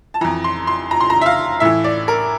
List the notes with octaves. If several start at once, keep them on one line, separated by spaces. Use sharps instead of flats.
A5
F2 E3 A#5
C6
C6
A#5
C6
A#5
E5
F5
A2 E3 E5
D5
A#4